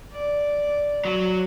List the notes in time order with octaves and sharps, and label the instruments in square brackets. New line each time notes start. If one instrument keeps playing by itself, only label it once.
[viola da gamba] D5
[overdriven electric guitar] F#3